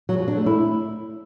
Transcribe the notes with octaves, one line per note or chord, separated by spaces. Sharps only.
F#3
F3
D4
A3
E4